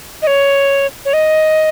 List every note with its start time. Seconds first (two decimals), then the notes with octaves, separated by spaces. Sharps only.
0.22 D#5
0.27 C#5
1.05 C#5
1.13 D#5